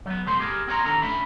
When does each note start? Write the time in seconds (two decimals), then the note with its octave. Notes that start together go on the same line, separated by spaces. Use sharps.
0.06 F#3 B3
0.26 C#2 B2 A3 C5 C6
0.40 G4 G#4 A#4
0.67 C4 A#4 C#5 A#5 C6
0.85 D#3 E3 D4 A4 A#5
1.02 A3 C#4 D4 E5 B5